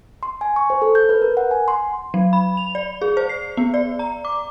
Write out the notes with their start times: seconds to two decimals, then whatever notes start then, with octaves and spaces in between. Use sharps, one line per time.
0.23 C6
0.41 G#5
0.56 C#6
0.70 C5
0.82 A4
0.95 G6
1.09 B4
1.22 A#4
1.37 F#5
1.51 G#5
1.68 C6
2.14 F#3
2.33 B5
2.57 F7
2.75 D5
3.02 G#4
3.17 C5
3.29 C7
3.57 B3
3.74 D5
3.99 A#5
4.25 D6